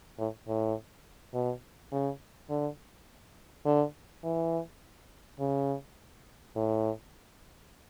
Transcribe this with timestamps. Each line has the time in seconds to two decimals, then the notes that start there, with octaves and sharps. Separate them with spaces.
0.19 A2
0.48 A2
1.34 B2
1.92 C#3
2.50 D3
3.65 D3
4.24 E3
5.40 C#3
6.56 A2